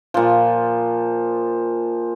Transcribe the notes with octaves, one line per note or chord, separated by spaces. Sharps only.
A#2 F3